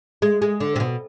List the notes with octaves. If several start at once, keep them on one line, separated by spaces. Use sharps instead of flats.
G#3
G#3
D3
C3
B2